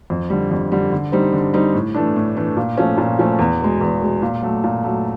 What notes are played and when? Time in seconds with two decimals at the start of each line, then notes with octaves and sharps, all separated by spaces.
0.10 F2
0.30 D3 G3
0.51 F2
0.72 D3 G3
0.92 D3
1.12 G3 C4 D#4
1.33 D3
1.54 G3 C4 D#4
1.74 A2
1.95 E3 A3 D4
2.16 A2
2.36 E3 A3 D4
2.57 A#2
2.77 F3 A3 C#4
2.98 A#2
3.19 F3 A3 C#4
3.39 E2
3.61 B2 G#3
3.81 E2
4.01 B2 G#3
4.22 A#2
4.42 F#3 A3
4.64 A#2
4.83 F#3 A3